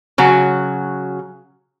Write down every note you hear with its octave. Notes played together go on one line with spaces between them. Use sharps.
C#3 F#3 F#4